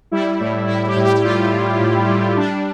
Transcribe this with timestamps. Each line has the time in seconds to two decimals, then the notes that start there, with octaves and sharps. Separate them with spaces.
0.11 G3 E4
0.40 A2
0.67 A2 E4
0.87 G4
0.96 A2
1.05 G4
1.24 G3 F4
1.52 A2
1.80 A2
2.07 G3
2.37 G3 D4